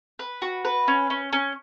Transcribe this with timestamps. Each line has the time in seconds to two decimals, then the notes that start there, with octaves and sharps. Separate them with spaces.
0.19 B4
0.42 F#4
0.65 B4
0.88 C#4
1.10 C#4
1.33 C#4